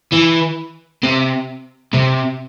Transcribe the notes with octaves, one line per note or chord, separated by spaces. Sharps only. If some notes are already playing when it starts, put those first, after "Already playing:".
E3
C3
C3